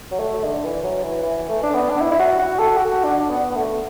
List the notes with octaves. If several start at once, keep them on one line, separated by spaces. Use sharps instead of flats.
F#3
A3
D3
E3
F#3
E3
E3
A3
D4
B3
D4
E4
E4
F#4
F#4
A4
F#4
D4
D4
B3
B3
A3